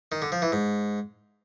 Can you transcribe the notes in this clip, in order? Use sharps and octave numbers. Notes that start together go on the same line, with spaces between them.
D#3
D3
F3
E3
G#2